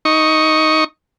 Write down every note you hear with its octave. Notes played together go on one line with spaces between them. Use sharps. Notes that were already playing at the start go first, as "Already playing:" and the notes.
D#4 C#6